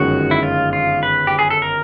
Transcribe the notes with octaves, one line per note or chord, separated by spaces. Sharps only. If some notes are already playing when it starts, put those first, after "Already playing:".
Already playing: G1 F#2 D#3 G#3 C#4 F#4
E4
F4
F4
B4
G4
G#4
A4
A#4